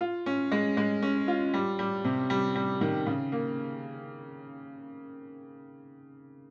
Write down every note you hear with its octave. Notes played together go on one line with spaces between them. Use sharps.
F4
C#4
G#3
G#3
C#4
F4
G3
G3
C3
G3
G3
D#3
C#3
A#3